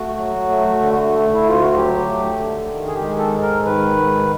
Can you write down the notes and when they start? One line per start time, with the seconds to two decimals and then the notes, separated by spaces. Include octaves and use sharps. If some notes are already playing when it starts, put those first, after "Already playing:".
Already playing: A3 F#4
0.18 F#3
0.49 A3
0.80 D3
1.12 A3
1.34 E4
1.44 D2 F4
1.62 F#4
1.76 F#3 G4
2.08 A3
2.39 D3
2.71 D#3
2.87 G#4
2.94 G4
3.02 G#3
3.18 A4
3.34 G#2
3.42 A#4
3.65 D#3 B4
3.97 G#2